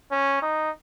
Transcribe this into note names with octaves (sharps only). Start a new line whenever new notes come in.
C#4
D#4